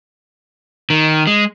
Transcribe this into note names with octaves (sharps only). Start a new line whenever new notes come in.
D#3
G#3